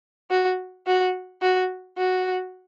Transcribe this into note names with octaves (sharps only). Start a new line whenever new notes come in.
F#4
F#4
F#4
F#4